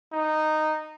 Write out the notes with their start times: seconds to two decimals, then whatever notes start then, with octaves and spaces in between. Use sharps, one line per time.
0.12 D#4